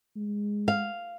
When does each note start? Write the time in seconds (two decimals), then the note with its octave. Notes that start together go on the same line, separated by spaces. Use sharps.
0.16 G#3
0.68 F5